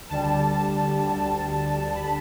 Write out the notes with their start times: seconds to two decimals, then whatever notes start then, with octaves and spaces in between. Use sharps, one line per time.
0.09 D2 D3 G3 A5
1.02 D2 D3 G3
1.94 D2 D3 G3 B5